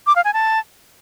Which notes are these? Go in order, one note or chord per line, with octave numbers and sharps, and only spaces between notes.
D6
F5
G#5
A5